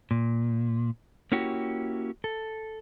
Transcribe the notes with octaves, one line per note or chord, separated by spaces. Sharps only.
A#2
A#3 C#4 E4 F#4 G4
A4